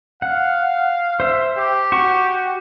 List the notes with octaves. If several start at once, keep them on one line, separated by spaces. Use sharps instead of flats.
F5 F#5
C5 E5
G4
F#4 C#6